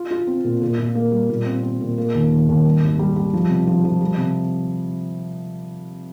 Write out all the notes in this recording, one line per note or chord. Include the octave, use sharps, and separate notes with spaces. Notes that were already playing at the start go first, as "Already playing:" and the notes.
Already playing: F4
F4
C4
A#2
A#2
A#2
A#3
G3
A#2
C4
C4
A#2
A#3
D#2
D#2
D#2
G3
G#1
G3
G3
F3
C3
F3
F3
G3
C3